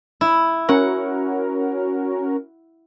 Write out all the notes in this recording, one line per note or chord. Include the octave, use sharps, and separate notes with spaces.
E4
C#4 F#4 A#4 F#5